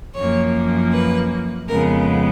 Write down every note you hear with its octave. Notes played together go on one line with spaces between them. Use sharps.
F#2 F3 A#3 C#5
B4
F2 C#3 G#3 B3 A#4